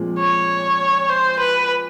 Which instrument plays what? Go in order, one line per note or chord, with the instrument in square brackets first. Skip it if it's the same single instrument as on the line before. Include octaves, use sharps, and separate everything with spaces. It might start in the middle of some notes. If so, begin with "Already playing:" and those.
Already playing: [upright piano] A#2 F3 G#3 C4
[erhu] C#5
C5
B4